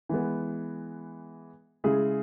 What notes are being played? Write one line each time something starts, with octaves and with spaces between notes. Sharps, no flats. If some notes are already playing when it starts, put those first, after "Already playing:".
E3 G#3 B3
C#3 G#3 E4 G#4